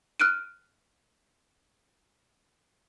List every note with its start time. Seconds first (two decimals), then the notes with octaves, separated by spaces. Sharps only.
0.20 F6 F#6 D7 D#7